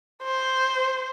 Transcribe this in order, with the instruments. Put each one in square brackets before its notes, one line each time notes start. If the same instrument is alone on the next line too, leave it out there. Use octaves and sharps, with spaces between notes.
[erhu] C5